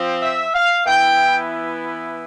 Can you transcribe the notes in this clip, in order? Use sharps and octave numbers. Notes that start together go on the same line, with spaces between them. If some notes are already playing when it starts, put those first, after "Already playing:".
Already playing: F3 C4
E5
F5
E3 B3 E4 G5